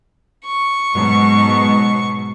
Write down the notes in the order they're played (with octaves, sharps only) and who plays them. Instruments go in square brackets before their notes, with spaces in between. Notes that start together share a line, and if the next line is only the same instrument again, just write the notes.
[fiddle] C#6
[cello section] G#2 B2 F#3